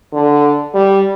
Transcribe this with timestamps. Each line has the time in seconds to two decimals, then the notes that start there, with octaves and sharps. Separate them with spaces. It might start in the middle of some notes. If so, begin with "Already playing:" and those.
0.13 D3
0.74 G3